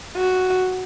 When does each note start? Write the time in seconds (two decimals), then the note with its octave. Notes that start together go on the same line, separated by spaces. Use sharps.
0.17 F#4